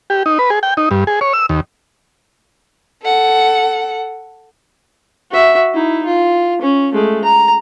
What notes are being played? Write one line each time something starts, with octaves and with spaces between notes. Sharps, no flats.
G4
D#4
B4
G#4
G5
D#4
G2
G#4
C#5
E6
D#2
A4 F#5
F#4 E5
D#4 E4
F4
C#4
G#3 A3
A#5